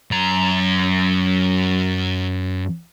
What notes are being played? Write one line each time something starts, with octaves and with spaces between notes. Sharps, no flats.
F#2 A#5